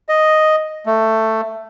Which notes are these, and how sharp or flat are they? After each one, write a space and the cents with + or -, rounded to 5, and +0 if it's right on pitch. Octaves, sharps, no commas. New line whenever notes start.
D#5 +0
A3 +10